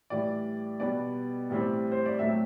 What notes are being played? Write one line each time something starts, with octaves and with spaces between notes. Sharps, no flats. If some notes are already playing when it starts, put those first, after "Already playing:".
A2 E3 G3 D5
B2 G3 B3 D5
A2 E3 G3 C4
C5
D5
A2 F#3 A3 C4 E5